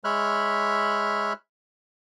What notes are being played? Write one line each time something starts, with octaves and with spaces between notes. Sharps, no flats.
G#3 C#5 E5 B5 F6 F#6